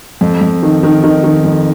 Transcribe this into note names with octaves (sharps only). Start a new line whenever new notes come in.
F2
F2
D#3
D#3
D#3
D#3
F2